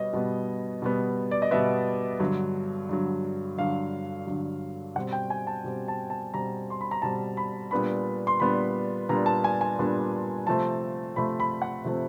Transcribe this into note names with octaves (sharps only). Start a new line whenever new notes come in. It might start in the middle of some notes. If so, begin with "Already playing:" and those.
Already playing: B2 G3 B3 C#5 D#5
B2 G3 B3
B2 G3 B3
D5
D#5
B2 G3 B3 E5
G2 D3 F#3
G2 D3 F#3
G2 D3 F#3 F5
G2 D3 F#3
B2 G3 C4 F#5
G5
G#5
A5
B2 G3 C4
A5
A5
B2 G3 C4 A#5
C6
B5
A#5
B2 G3 C4 A5
B5
A#2 G3 B3 D4 B5
C6
A#2 G3 B3 D4 B5
A#2 G3 B3 D4 A#5
A5
G#5
G#5
A#2 G3 B3 D4
C3 F3 A3 C4 A5
C3 F3 A3 C4 B5
B5
F#5
C3 F3 A3 C4